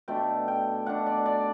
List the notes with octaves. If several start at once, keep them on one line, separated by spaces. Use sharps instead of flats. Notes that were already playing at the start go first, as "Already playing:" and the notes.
B2 A3 D4 G5
G5
B2 A3 D4 F#5
D5
D5